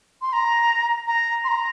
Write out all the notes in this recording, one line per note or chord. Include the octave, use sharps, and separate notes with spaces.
C6
A#5
A#5
C6
A#5